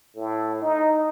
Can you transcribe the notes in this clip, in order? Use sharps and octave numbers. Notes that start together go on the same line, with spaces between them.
A2
D#4